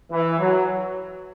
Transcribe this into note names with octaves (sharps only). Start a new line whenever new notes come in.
E3
F#3